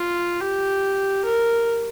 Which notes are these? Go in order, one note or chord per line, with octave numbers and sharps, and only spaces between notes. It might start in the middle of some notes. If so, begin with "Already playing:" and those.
Already playing: F4
G4
A#4